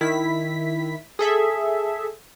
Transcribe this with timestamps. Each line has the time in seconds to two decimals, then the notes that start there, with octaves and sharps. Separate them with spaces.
0.01 D#3 E4 B6
1.19 G#4 A4 E5